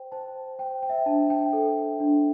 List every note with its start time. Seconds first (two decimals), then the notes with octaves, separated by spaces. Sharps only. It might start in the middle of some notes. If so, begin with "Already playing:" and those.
Already playing: C5 G5
0.12 C5 A5
0.59 C5 G5
0.83 G5
0.89 E5
0.97 G5
1.06 D4 A5
1.30 G5
1.53 A4
2.00 D4